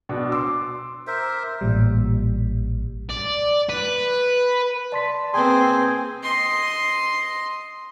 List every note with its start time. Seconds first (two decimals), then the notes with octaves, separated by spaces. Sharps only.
0.09 B2 D4
0.32 C6 D6 E6
1.07 A#4 C5 E5
1.61 A1 A#2 G3
3.09 D5
3.69 B4
4.92 D5 A5 C6 B6
5.34 A#3 C4 G#4 B4 G5 G#5 C6
6.23 D#5 C6